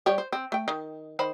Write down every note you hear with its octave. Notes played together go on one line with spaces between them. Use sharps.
G3 G4 C#5
C5
C4
A3 G5
D#3
D#3 C5 B5